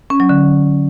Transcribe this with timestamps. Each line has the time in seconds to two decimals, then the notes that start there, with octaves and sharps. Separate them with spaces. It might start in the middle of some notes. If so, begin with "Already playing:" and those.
0.10 C#4
0.20 F#3
0.29 D3